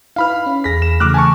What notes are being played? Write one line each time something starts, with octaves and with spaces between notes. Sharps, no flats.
D#4 E4 B4 F5 B5 F6
C#4
E2 G#4 B5 A#6 B6
E7
C#3 E3 A3 D6 F6 F#6
G#5 A5 C#6